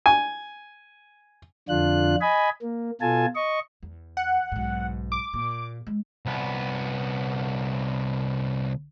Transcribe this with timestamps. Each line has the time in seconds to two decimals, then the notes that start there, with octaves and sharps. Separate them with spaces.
0.06 G#5
1.69 F2 D3 D4 F4 F#6
2.21 D#5 G#5 B5
2.62 A#3
3.01 B2 F4 A4 G#5 A5
3.35 D#5 C#6
3.83 E2
4.17 F#5
4.52 B1 G#2
5.12 D6
5.34 A#2
5.87 G#3
6.26 C2 B3